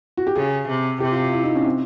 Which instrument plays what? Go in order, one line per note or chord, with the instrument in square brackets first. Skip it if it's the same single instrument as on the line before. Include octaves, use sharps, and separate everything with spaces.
[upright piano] F#4
G4
[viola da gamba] C#3 [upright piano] G#4
[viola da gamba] C3
[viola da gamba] C3 [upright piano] G4
[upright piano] F4
F4
E4
D#4
C#4
C4